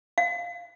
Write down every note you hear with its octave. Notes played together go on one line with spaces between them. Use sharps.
F5